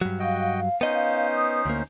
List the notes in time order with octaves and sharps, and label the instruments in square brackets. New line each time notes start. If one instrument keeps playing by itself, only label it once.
[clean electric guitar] G2 F#3
[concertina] F#4 D#5 G5 [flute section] F5
[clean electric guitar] B3 D#5 [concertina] C#4 D#4 C5
[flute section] D#6
[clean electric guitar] D2 A#3